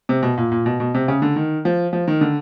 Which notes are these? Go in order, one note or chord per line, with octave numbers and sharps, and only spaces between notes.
C3
B2
A#2
A#2
B2
B2
C3
C#3
D3
D#3
F3
F3
D#3
D3